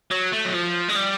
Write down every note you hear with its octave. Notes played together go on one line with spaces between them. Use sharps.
F#3
A3
F#3
F3
G#3
G3